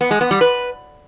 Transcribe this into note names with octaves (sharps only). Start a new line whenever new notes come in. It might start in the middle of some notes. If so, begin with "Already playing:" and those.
B3
G#3
B3
G3
B4